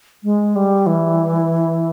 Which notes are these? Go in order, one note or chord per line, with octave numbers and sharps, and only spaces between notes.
G#3
G3
E3